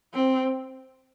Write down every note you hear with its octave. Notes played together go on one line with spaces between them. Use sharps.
C4